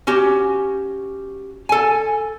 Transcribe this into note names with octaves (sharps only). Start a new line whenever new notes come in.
C#4 F#4 G4
A4 G#5